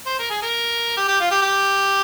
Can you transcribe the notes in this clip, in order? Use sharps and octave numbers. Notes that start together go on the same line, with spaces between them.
C5
A#4
G#4
A#4
G4
G4
F4
G4
G4